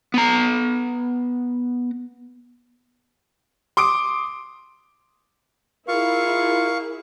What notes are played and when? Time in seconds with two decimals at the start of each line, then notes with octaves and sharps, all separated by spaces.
0.14 B3 A#5
3.77 C6 D6 D#6 D7
5.88 E4 F4 G#4 A#4 F5 C#6